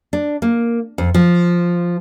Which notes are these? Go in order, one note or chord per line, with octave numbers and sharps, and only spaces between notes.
D4
A#3
F2
F3